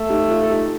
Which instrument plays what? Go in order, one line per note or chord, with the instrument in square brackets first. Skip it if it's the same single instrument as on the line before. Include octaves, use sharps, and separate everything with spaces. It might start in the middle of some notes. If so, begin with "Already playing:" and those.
Already playing: [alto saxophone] A3
[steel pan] D#4 G4
F4 A4
A4
D#4 G4